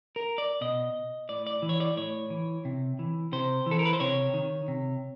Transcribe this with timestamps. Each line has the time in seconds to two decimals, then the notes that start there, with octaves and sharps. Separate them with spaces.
0.16 A#4
0.38 D5
0.61 B2 D#5
1.29 A2 D5
1.47 D5
1.62 E3
1.69 C#5
1.80 D5
1.97 A2 C#5
2.30 E3
2.65 C3
2.99 E3
3.32 C3 C5
3.66 E3 A4
3.79 A#4
3.85 B4
3.93 C5
4.00 C3 C#5
4.34 D#3
4.68 C3